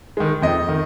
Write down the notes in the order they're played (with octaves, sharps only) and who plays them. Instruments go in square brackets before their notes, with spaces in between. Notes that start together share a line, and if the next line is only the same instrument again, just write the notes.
[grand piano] D#3 G#3
F2 D#5
D#3